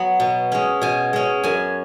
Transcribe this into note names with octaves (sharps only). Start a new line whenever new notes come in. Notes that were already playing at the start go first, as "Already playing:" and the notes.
Already playing: F#3 B3
B2
G#3 C#4
B2 G#5
G#3 C#4
F#2 G#5